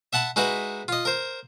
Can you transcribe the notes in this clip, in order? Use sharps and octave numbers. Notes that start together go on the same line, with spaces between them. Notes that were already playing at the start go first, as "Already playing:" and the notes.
E5 F#5 A5 B5
G#3 D#4 E4 F#4 B4
F4 D#5
A#4 C5